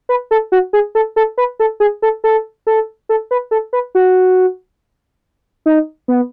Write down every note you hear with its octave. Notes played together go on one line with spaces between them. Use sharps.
B4
A4
F#4
G#4
A4
A4
B4
A4
G#4
A4
A4
A4
A4
B4
A4
B4
F#4
D#4
B3